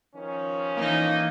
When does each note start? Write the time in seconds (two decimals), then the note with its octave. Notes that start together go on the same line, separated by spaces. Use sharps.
0.15 D#3 F3 C#4
0.77 E3 A#3 D#4